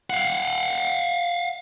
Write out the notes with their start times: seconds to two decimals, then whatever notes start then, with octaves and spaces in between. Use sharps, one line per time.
0.10 F5 F#5